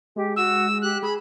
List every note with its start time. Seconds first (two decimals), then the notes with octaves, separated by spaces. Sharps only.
0.16 G#3 G4
0.36 F#4 E6
0.82 G4 F#6
1.03 G#4 B5